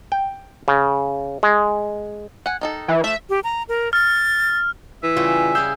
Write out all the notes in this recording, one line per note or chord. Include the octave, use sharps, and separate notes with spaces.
G5
C#3
G#3
F#5 G#5
D#3 D#4 A4
E3
F3 A3 E5
G4
A#5
A#4
F6 A6
E3 E5
C#3 G3 C#4 F4
E4 G#4 F5 D#6 E6 G6